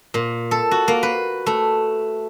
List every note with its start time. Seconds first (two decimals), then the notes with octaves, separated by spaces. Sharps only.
0.14 A#2
0.51 A4
0.71 F#4
0.88 A#3
1.03 B4
1.46 A3